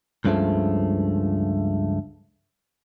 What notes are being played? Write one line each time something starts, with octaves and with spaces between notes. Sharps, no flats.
C#2 G2 C#3 F3 A3